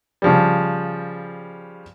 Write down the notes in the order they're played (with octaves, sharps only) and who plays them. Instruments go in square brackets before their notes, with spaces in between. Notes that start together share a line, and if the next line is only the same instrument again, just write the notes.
[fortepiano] C#3 F3 G3